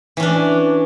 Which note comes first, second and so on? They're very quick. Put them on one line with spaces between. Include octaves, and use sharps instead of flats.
E3 C#4 D4